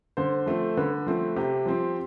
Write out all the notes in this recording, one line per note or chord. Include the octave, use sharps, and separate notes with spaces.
D3 C5
F3 A3 C4
D3 B4
F3 A3 C4
C3 G4
F3 C4